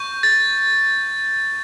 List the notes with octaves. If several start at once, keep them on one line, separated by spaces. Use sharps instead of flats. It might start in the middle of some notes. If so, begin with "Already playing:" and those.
Already playing: C#6 G6
A6